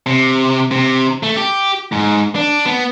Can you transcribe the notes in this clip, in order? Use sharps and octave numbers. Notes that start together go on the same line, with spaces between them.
C3
C3
A3
G4
G#2
D4
B3